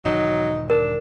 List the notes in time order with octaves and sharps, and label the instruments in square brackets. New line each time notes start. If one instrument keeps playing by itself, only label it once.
[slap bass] E1 G#2 D#3 [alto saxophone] F#3 [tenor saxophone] D#4
[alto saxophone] D4 [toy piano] A#4